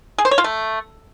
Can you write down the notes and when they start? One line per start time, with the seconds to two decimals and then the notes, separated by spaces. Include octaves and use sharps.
0.18 G#4
0.25 C5
0.31 C#5
0.38 F4
0.44 A3